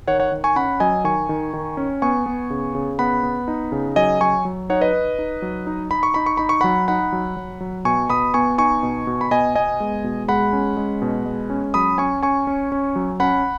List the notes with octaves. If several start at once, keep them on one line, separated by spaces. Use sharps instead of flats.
D#3 C#5 F#5
C#5 F#5
D#3
G#5 C#6
C#4 F#5 B5
F#3 D#5 G#5
D#3 G#5 C#6
D#3
D#3
C#4
B3 G#5 C#6
B3
C#3
C#3
B3 F#5 B5
B3
D#4
C#3
F#3 D#5 G#5
F#3 G#5 C#6
F#3
D#4 C#5 F#5
B4 D#5
D#4
D#4
F#3
D#4
D#4 B5
C#6
D#4 B5
C#6
D#4 B5
C#6
F#3 F#5 B5
D#4 F#5 B5
F#3
F#3
F#3
B2 G#5 C#6
B2 B5 D#6
B3 G#5 C#6
D#4 G#5 C#6
B2
B2
B5
B2 D#5 G#5
B3 D#5 G#5
G#3
B2
G#3 F#5 B5
C#4
G#3
B2
G#3
C#4
F#3 B5 D#6
C#4 G#5 C#6
C#4 G#5 C#6
C#4
C#4
F#3
C#4 F#5 B5